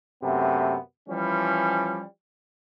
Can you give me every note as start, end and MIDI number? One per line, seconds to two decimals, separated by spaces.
0.23 0.76 42
0.23 0.76 48
0.23 0.76 57
0.23 0.76 59
1.08 2.03 52
1.08 2.03 53
1.08 2.03 55
1.08 2.03 61